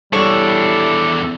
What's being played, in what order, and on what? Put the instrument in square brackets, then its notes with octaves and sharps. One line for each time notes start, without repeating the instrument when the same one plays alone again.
[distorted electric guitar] E2 D4 [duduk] G3 [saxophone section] E4 A4 [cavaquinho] C#5